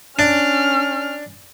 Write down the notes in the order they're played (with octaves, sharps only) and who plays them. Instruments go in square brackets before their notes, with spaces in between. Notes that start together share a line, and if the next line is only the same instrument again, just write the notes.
[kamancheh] C#4 F6 [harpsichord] D4